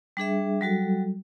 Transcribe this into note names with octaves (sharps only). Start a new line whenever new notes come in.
G3 D4 G#4 E5
F#3 G3 F#4 A4